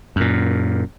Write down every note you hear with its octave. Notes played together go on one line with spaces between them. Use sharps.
F#2 A#2